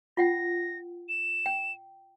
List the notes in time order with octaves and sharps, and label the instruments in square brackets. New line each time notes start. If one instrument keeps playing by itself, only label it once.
[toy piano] F4 F#5 G5 [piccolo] A#6
[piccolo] E7
[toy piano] G5